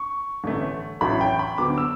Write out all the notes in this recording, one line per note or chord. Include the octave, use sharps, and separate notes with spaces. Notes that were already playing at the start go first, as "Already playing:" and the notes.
Already playing: C#6
A1 G2 D3 A3 C#4
A1 A2 F#3 C#4 B5
G5
B5
D2 D3 F#3 B3 D6
E6